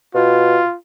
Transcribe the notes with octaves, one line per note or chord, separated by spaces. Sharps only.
B2 F4